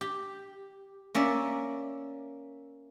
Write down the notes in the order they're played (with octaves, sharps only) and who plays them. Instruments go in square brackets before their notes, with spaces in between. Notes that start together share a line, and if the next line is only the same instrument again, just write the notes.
[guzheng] G4
A#3 C#4 D5 E5